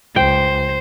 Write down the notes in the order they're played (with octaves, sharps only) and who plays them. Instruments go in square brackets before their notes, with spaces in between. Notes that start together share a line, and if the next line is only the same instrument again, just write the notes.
[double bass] C#2 [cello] C5 [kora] G5